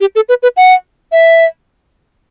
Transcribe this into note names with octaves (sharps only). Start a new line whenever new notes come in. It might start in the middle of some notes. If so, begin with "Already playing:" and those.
G4
A4
B4
B4
F#5
E5